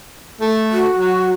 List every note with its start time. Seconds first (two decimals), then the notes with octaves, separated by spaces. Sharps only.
0.41 A3
0.71 F#4
0.97 F#3